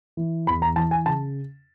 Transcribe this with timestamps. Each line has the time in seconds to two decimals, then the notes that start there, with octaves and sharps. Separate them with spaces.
0.17 E3
0.47 E2 B5
0.62 A#5
0.76 E3 A5
0.91 G#5
1.06 C#3 A5